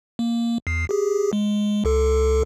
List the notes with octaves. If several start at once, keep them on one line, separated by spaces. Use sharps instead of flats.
A#3
E2 C7
G4 G#4
G#3
C#2 A4